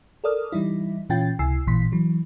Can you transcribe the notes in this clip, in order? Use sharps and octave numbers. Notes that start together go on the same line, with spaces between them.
A4 A#4 D5 D#6 F6
E3 G3 D#4 E4
A#2 E3 C#4 F4 G5 A6
C#2 C3 E4 G#5 E6 C7
A1 A#2 E3 C6 B6
E3 F#3